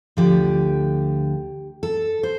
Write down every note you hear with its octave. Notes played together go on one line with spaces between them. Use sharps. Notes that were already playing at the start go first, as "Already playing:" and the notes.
D2 D3 F3 G4
A4
C5